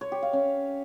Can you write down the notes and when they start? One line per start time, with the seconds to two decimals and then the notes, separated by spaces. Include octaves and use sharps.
0.01 C#5
0.12 G4
0.22 F5
0.33 C#4